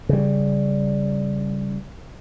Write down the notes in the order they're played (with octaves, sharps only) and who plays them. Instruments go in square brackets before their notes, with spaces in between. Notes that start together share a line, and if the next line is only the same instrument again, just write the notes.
[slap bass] C#3 G3